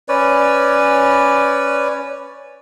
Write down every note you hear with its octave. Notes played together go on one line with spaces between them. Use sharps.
C#4 B4 C#5 D5